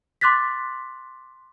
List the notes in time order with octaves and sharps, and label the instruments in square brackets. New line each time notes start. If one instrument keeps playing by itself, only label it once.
[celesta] C6 D6 F#6 A6 B6